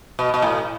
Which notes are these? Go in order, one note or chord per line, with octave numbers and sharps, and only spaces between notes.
B2
B2
A2